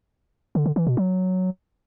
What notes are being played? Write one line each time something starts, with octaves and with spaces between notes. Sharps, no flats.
D3
D3
E3
B2
F#3